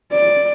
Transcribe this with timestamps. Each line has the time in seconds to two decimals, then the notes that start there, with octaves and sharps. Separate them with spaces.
0.13 D5